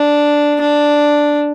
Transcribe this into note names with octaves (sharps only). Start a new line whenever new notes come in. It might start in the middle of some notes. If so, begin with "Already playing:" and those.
Already playing: D4
D4